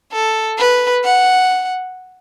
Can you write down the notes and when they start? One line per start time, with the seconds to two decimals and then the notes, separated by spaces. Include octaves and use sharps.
0.12 A4
0.58 B4
1.04 F#5